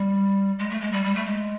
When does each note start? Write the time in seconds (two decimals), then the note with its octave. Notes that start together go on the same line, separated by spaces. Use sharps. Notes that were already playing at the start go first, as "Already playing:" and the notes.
Already playing: G3
0.59 G#3
0.70 A3
0.81 G#3
0.92 G3
1.04 G3
1.15 A3
1.26 G#3